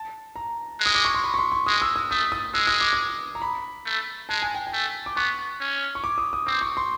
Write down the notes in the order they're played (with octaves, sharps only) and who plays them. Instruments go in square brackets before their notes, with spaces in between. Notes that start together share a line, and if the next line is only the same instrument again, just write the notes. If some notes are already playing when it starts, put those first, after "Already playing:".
Already playing: [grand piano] A5
A#5
[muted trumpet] G#3
[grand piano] D#6
D6
C#6
C6
B5
C#6
C6
C#6
[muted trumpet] G#3 [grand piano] D#6
[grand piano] E6
D#6
[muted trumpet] A3 [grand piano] D#6
[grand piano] D#6
[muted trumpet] G#3 [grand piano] E6
[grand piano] D#6
D6
D#6
A#5
B5
[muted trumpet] A3
[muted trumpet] G#3 [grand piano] A5
[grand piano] G#5
G5
G#5
[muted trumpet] A3
[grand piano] D6
[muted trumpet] B3 [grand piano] C#6
[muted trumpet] C#4
[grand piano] C#6
D6
D#6
D#6
[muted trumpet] C4 [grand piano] D6
[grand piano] C#6
C6